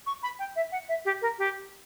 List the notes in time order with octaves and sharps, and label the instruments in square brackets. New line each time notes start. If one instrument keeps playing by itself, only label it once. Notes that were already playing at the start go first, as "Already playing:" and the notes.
[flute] C#6
B5
G5
E5
F#5
E5
G4
A#4
G4